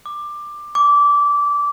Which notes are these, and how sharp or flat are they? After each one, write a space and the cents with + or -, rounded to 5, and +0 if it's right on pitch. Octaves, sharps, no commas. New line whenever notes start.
D6 +15
D6 -20